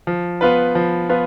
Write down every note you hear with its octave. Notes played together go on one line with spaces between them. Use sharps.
F3
B3 F4 B4
F3
B3 F4 B4